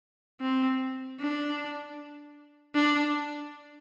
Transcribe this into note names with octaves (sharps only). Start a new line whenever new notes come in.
C4
D4
D4